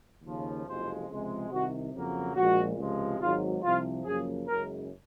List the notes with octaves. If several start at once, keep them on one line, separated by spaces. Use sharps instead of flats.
D#2 C#3 F3
F#1 F2 C3 F3 G#3 C5
C#2 C3 F3 G#3
C2 C3 D#3 F#4
F2 C#3 F#3 A#3
A#1 A#2 G#3 F#4
C#2 C3 F3 G#3
G#1 G#2 F#3 F4
C2 C3 F3 F4
F#2 C#3 F3 A#3 G#4
F#1 F#2 C#3 G#3 A#4